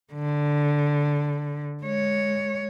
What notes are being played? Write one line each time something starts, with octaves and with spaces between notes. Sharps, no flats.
D3
G#3 C#5